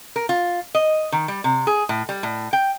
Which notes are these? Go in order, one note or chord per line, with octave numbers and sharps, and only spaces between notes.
A#4
F4
D#5
D#3
G3
C3
G#4
A2
G3
A2
G5